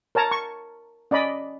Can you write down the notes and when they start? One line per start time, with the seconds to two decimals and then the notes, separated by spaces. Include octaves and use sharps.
0.15 A#4 C#5 A5 A#5
0.31 C#6
1.11 C#4 D5 D#5 B5